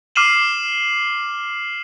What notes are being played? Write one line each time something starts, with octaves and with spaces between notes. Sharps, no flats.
D6 F6 C7 D#7 E7 F#7